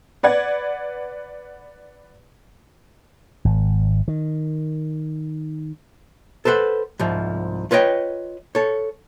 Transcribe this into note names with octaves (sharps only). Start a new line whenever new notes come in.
B4 D5 F#5 G#6
G#1
D#3
A4 B4 C5 E5 F#5
C2 G#2 F3
F4 B4 C#5 D#5 G5
A4 C#5